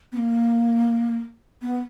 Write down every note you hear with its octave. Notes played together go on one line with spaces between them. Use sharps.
B3
A#3
B3